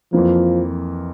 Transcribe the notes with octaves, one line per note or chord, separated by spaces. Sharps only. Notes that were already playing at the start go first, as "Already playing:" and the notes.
F2 E3 F3 A#3